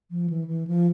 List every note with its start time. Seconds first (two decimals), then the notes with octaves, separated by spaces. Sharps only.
0.11 F3
0.30 E3
0.48 E3
0.67 F3